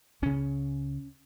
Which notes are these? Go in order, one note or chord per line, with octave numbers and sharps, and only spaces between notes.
C#2 C#3 C#4